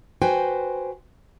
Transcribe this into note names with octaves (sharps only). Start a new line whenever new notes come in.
F#4 B4 C5 G5 G#5